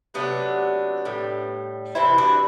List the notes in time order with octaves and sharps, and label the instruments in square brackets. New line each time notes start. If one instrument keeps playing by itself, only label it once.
[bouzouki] C3 F#3 A3 B3 D4
A2 G3
C3 E3 G3 C4 E4
D4 F#4